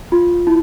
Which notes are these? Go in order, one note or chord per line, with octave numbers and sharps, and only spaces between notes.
F4
E4